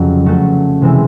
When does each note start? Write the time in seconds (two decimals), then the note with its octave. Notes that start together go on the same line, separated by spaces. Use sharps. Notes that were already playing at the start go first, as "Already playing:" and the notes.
Already playing: F2 C#3 F#3
0.25 F#3 A3 C#4 F#4 A4
0.82 C3 E3 G#3 C4 E4